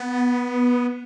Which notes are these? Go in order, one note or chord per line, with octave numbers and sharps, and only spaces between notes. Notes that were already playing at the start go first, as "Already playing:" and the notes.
Already playing: B3